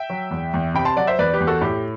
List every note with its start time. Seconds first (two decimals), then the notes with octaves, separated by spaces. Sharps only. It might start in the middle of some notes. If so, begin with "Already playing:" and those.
Already playing: E5 G5
0.10 F#3
0.31 E2
0.54 E2
0.74 C3 G5 B5
0.85 A5 C6
0.96 F#3 D5 F#5
1.07 C5 E5
1.19 E2 B4 D5
1.34 G4 B4
1.41 E2
1.47 F#4 A4
1.61 A2 G4